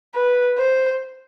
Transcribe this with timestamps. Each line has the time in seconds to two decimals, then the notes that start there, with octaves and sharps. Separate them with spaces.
0.14 B4
0.58 C5